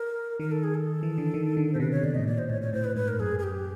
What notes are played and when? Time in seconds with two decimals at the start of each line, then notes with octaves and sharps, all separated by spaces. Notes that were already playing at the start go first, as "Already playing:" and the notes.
Already playing: A#4
0.40 D#3 A#4
0.51 A4
0.64 G#4
0.75 A4
1.03 E3
1.18 D3
1.34 D#3
1.57 D3
1.73 B2 C5
1.80 C3 B4
1.91 C#5
2.03 B2 D5
2.15 A2 D#5
2.27 A#2 D5
2.38 C5
2.49 A2 C#5
2.62 C#5
2.73 A2 C5
2.84 B4
2.96 G#2 B4
3.08 A#4
3.20 F#2 G#4
3.39 G#4
3.43 G4